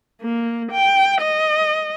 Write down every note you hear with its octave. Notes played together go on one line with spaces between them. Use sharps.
A#3
G5
D#5